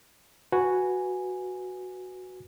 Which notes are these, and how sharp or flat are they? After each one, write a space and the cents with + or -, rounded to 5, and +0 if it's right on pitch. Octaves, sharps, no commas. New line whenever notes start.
F#4 +0 B4 +0 G#5 +0